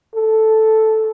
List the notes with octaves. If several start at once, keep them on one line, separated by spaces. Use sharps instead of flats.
A4